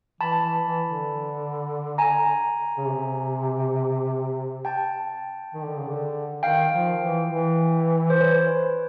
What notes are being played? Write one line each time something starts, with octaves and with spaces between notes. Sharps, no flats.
E3 A5 B5
E3
E3
D3
G#5 A#5
C#3
C3
G5 A5
D#3
D3
C#3
D3
D#3 F5 G5
F3
E3
E3
C5
B4 C#5